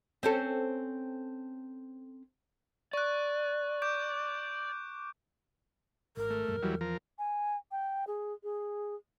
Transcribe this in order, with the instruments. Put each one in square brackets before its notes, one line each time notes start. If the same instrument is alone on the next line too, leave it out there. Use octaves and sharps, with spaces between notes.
[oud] C4 C#4 A4
[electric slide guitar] D5 [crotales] C#6 F#6
[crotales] D6 G6 D7
[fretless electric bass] G#1 [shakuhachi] A#4
[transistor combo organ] A3
[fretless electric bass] E1 G2
[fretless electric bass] E2 [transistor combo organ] E3 F#3 G3
[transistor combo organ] F3 A#4
[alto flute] G#5
G5
G#4
G#4